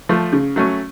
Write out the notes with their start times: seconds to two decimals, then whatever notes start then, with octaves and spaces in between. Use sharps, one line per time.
0.09 F3 A3
0.33 C#3
0.56 F#3 A3 C#4